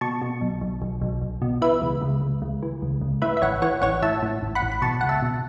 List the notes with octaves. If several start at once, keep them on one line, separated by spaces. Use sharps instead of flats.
B2 A5 C#6
B2
B1
B1
B1
B1
B1
B2
E3 B4 E5
C#2
C#2
C#2
C#2
E3
C#2
C#2
A2 B4 E5
E5
A1 C#5 F#5
E3 C#5 F#5
A1 C#5 F#5
A2 E5 A5
A2
A1
F#5 B5
A1
B5
B2 A5 C#6
C#2 F#5
E5 A5
B2